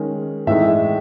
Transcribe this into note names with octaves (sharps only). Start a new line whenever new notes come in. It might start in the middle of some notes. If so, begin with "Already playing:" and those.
Already playing: D#3 G#3 C#4
A2 E3 G#3 D#4 E5